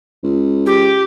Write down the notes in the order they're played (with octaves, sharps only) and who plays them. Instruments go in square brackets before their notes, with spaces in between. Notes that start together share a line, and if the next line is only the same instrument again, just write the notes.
[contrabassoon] C#2
[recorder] G4